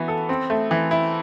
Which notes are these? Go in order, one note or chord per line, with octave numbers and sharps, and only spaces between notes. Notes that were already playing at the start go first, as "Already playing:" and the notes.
Already playing: E3 B3 F#4
A4
C4
A3
E3
E4